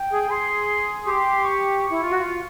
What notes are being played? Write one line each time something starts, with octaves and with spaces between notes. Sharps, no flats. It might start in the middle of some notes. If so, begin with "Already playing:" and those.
Already playing: G5
G#4
G#4 C6
G4 C6
C#6
C#6
E4
F4
F#4
F4